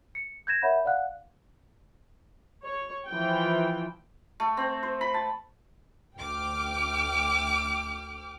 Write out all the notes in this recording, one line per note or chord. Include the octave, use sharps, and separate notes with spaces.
C#7
G6 G#6 A#6 E7
A#4 C#5 E5 F#5 B5 G6
D5 F5 F#5 F#6
C#5
E3 F3 G5
A3
C4
C5
B5
A5
D2 G5 D6 F6